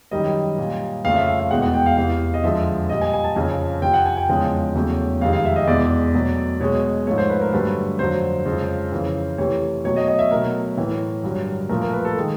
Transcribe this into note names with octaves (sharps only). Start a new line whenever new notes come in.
F#2 D#3 G3 D#5
A#2 G3
F2 C#3 F3 A3 F5
E5
F5
F5
E2 B2 G#3 F#5
F#5
G5
F5
E2 C3 E3 F5
D#5
F2 D3 F3 G#3 E5
A#2 G3 D#5
G#5
G#5
A5
F2 C#3 F3 G#5
F2 C3 F3 G5
F#5
G#5
G5
E2 C#3 F3 G#3
E2 C#3 F#3 A3
F2 C3 D#3 G#3 F5
F5
E5
D#5
E2 B2 G#3 D5
B2 F#3 A3
B2 G#3 C#5
G#2 F3 A3 C#5
C5
B4
A#4
G2 D3 F#3 A3 B4
F2 D3 F#3 C5
F2 C#3 F3 G#3
F2 C#3 E3
C3 E3 A3 C#5
B2 F#3 A3 C#5
D#5
D#5
E5
B2 F#3 A3 A#4
A2 E3 A3
G2 D3 F#3
A#2 F3 A3 A#4
A#4
B4
A4
D#3 G#3